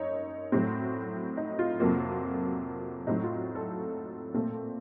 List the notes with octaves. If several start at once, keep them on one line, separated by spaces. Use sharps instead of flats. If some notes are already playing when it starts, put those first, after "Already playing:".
Already playing: F#2 D#4 C#5
A2 F#3 C4
D#4
F4
F2 C3 F#3 A#3 F4
A2 F#3 C4 D#4
F4
A4
A#2 A3 C4 A4